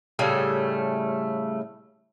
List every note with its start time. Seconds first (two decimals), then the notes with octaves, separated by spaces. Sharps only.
0.19 A2 C#3 G3 A3